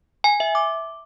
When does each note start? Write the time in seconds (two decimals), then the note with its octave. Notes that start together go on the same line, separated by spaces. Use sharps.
0.24 G#5
0.40 E5
0.55 D6